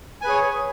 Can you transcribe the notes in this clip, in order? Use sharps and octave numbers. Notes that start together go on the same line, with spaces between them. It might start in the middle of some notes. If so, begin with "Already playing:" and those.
G#4 B4 C#5 G#5